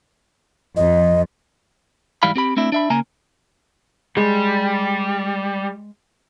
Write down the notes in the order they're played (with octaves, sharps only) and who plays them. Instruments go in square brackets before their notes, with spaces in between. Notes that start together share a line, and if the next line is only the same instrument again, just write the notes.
[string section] F2 [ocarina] D#5
[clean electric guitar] G#2 E3 G3 F5 B5
C4 G4 B5
A3 C4 D4 E4
D4 E5 B5
C#3 A#3 G#5 A#5
[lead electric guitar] G3 [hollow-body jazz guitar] G#3